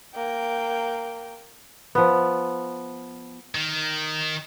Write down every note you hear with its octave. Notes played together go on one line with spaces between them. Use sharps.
A#3 G5
F3 B3
D#3